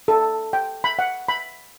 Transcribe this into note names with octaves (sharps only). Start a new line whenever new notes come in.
A4
G5
B5
F#5
B5